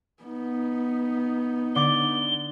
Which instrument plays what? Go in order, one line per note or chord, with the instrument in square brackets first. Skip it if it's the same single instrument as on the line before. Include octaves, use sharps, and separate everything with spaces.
[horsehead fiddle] B3 D#4
[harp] D3 D6 A6 [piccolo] G7